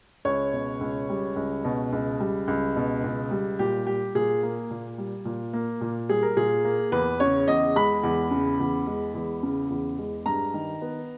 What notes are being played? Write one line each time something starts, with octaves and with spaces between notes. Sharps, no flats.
C#2 C#5
B2
C#2
G3
C#2
B2
C#2
G3
C#2
B2
C#2
G3
A#2 G4
G3 G4
A#2 G#4
A#3
A#2
G3
A#2
A#3
A#2
G3 G#4
A#4
A#2 G#4
A#3
E2 B4
C#3 C#5
E2 D#5
G#3 B5
E2
C#3
E2
G#3
E2
C#3
E2
G#3
G2 A#5
D#3
B3